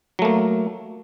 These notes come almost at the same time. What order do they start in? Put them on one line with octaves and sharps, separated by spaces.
F#3 A3 A#3